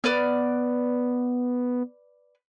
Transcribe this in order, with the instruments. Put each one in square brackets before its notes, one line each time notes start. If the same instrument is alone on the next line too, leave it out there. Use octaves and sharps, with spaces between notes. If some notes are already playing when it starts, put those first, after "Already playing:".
[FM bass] B3 [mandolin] B4 D5 F6